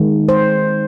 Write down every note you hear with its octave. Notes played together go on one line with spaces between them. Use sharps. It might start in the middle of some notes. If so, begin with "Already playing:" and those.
Already playing: D#3 G#3
C5